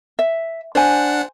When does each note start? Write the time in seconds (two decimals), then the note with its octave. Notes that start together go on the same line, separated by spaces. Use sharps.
0.19 E5
0.75 D4 C5 F#5 G#5